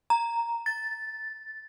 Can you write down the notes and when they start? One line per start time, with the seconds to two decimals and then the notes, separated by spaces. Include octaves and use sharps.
0.10 A#5
0.66 A6